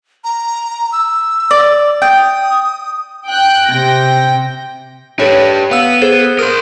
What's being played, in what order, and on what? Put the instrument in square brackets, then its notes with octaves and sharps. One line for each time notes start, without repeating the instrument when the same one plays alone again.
[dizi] A#5
E6
[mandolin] D5
[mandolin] G5 [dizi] D#6
[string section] G5 F#6
C3 G5 A#6
[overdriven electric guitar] G4 B4 [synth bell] A4 C#5
[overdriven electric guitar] B3 [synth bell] F5 E6
[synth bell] G#4 A4 C5
[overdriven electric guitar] A#4 C5 [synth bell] D#6